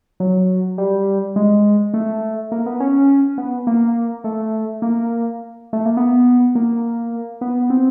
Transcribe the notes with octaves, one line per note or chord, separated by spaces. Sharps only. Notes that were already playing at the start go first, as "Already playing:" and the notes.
F#3
G3
G#3
A3
A#3
B3
C#4
B3
A#3
A3
A#3
A3
A#3
B3
A#3
B3
C4